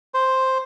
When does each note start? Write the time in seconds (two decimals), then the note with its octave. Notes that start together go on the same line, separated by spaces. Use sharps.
0.14 C5